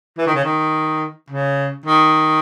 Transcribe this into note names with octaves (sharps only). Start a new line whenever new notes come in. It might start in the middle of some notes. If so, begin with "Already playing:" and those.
E3
D#3
C#3
D#3
C#3
D#3